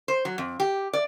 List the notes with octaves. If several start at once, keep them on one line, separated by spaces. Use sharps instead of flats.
C5
F#3
F2
G4
D5